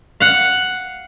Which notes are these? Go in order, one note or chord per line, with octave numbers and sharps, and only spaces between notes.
F5 F#5